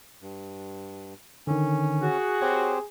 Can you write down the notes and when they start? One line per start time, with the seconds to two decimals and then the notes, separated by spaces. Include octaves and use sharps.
0.22 G2
1.47 D3 D#3 C#4
2.02 F#4 G#4
2.42 C4 G4 C5 C#5